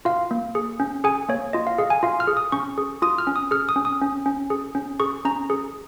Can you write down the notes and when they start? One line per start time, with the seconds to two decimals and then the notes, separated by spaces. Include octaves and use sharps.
0.05 F4 F5
0.31 A#3
0.55 G#4
0.80 C#4
1.04 G#4 G#5
1.29 A#3 C#5
1.53 F4 D#5
1.67 F5
1.78 G#4 F5
1.90 G#5
2.03 F4 F5
2.20 F6
2.27 G#4
2.37 D#6
2.52 C#4 C#6
2.78 G#4
3.02 F4 D#6
3.18 F6
3.27 C#4
3.36 D#6
3.51 G#4 F6
3.69 D#6
3.76 C#4
3.85 D#6
4.01 C#4
4.26 C#4
4.50 G#4
4.75 C#4
5.00 G#4 C#6
5.25 C#4 A#5
5.50 G#4